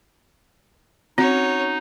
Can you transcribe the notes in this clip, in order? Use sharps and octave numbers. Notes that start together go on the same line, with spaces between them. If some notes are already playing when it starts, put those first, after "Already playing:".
C4 C#4 D#4 F#4 C#5